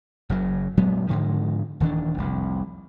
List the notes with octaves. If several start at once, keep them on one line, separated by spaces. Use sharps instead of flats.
F#1 C#3 F#3
A#2 F#3 G#3 B3
G#2 D3 D#3 F3
D#1 D#3 E3 D4
F1 C2